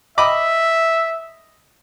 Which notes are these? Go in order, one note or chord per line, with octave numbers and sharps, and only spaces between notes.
D#5 E5 B5 D6